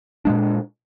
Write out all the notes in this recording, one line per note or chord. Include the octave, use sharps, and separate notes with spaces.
A#2 G#3 D4